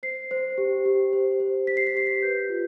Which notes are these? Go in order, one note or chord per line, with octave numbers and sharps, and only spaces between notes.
C5 C7
C5
G4
G4
C5
C5
G4 B6
C7
B6
G4 C7
B6
B4 G6
F4